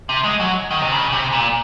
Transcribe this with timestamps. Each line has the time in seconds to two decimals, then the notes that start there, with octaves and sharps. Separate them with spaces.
0.09 C3
0.24 G#3
0.40 F#3
0.71 D#3
0.82 C3
0.92 C#3
1.13 C3
1.32 A#2